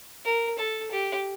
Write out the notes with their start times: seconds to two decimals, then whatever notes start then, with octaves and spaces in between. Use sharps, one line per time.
0.25 A#4
0.58 A4
0.91 G4